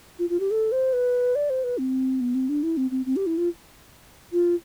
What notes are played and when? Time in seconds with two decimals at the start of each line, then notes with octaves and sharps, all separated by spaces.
0.19 F4
0.30 F4
0.40 G4
0.51 A4
0.72 C5
0.93 B4
1.35 D5
1.50 C5
1.64 B4
1.78 C4
2.21 B3
2.35 C4
2.49 D4
2.63 E4
2.77 C4
2.91 C4
3.06 C4
3.16 G4
3.26 E4
3.38 F4
4.33 F4